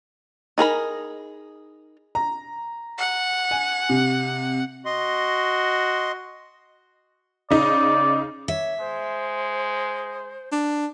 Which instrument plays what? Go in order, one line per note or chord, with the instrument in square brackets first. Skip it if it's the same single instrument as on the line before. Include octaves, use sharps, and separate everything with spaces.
[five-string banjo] D#4 G#4 A#4 B5
[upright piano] A#5
[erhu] F#5
[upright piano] G#5
C3
[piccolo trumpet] F#4 [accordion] D#5 C6
[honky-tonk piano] C#3 D#4 [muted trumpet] D5
[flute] C#5 [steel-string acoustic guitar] E5
[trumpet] G#3 [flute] C5
[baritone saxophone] D4